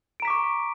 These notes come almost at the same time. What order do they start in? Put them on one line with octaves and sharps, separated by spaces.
D7 A#5 B6 D6 C#6